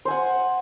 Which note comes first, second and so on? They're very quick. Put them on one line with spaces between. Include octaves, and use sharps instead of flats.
C5 G#5 F#5